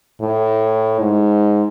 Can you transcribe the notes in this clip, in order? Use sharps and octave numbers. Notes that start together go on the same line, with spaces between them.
A2
G#2